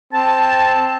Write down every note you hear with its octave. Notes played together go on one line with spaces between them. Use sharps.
C4 A5